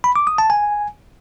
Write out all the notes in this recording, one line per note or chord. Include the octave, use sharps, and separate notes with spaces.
B5
D6
D#6
A5
G#5